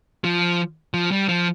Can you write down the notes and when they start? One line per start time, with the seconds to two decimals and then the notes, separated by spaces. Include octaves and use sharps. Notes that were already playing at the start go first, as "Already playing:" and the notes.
0.24 F3
0.94 F3
1.11 G3
1.29 F3